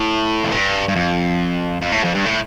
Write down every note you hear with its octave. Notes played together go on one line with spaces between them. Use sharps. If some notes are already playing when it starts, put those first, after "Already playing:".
Already playing: A2
F2
G2
G2
F2
F2
A2
F2
G2
A2